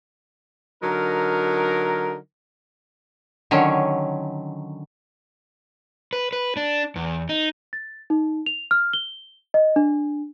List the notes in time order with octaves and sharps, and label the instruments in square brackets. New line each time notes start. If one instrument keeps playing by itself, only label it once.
[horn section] D3 F#3 D#4 A#4
[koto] D3 D#3 F#3 C#4
[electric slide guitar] B4
B4
D4
E2
D#4
[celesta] A6
D#4
F7
F6
G7
D#5
D4